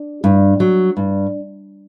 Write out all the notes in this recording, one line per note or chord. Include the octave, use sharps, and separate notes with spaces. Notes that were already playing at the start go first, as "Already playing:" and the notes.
Already playing: D4
G2
F#3
G2